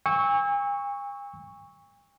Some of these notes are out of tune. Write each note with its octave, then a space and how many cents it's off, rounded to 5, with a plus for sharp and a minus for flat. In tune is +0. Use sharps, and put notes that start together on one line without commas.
G#5 -45 C#6 +0 E6 -20